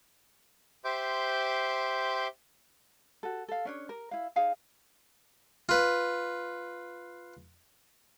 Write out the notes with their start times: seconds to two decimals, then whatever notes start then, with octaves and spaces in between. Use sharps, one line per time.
0.85 G4 C5 E5 C6 D6 G6
3.23 F#4 A4
3.48 A4 F5
3.65 C#4 D4 C#5
3.89 A#4
4.11 E4 F5
4.36 D#4 G#4 F5 G#5
5.69 F4 B4